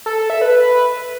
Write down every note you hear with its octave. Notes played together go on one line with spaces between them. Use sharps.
A4
A4
E5
B4